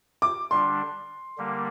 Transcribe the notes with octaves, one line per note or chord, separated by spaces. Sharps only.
D6
D3 G3 D4 C6
D3 G3 A#3